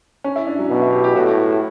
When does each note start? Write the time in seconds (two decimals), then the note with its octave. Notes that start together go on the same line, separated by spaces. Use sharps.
0.24 C#4
0.36 E4
0.47 D4
0.59 F#3
0.70 B2
0.82 E4
0.93 G4
1.04 G4
1.16 A2 F#4